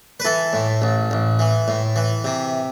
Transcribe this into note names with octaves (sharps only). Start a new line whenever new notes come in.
B4
E3 A4
A2
A1
A1
E3
A2
E3
C3